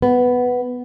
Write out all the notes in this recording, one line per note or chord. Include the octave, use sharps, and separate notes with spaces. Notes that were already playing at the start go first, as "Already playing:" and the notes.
B3